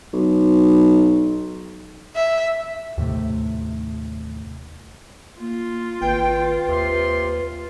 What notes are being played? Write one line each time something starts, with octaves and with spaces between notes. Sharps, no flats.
B1
E5
D#2 A2 C3 A3
A#3 F4
G#1 B4 G5
D#2 C3 C4 C6